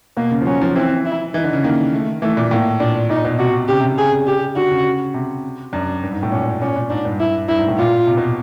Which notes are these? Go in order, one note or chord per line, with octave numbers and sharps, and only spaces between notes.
B2 A#3
C#3
F3
F#3 C#4
F3
E3 C4
E4
E3 D#4
D3
C#3
D#3 A#3
A3
E3 A3
A#2
A2 A#3
A#2 D4
A#2 D#4
B2
C3 F#4
C#3 G4
C3
C#3
G#4
G4
D3 F#4
C#3
C3
F#2 D4
G2
G#2
A2
A#2 C#4
A#2 C#4
A#2
G#2 D4
G2
E4
G2 E4
G#2
A2
A#2 F4
C3
B2